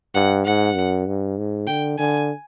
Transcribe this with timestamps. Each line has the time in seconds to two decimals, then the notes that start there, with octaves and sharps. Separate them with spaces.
0.15 G2 F#5
0.45 G#2 F#5
0.75 F#2
1.07 G2
1.38 G#2
1.67 D3 G5
1.99 D3 G#5